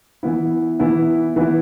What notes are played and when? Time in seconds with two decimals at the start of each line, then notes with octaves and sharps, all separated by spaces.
0.23 E3 B3 E4
0.79 E3 B3 E4
1.36 E3 B3 E4